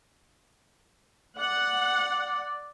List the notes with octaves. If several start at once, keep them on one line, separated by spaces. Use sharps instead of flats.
D5 F#5